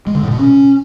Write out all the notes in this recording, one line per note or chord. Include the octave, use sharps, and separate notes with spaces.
G#3
D3
A2
B2
C#4